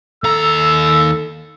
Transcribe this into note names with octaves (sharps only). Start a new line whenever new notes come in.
D#2 A4 A#5 E6